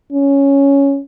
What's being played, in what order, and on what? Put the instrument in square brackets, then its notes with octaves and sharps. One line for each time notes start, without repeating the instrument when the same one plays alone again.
[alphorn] C#4